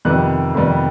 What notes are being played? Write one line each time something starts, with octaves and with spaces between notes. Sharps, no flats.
F2 C3 D#3 G3 B3 F#6
F2 C3 D#3 G3 B3